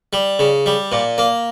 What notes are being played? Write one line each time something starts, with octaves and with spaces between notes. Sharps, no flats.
G3
C#3
G3
A#2
A#3